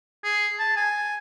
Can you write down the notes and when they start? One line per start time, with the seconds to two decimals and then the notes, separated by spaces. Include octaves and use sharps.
0.24 G#4
0.59 A5
0.76 G#5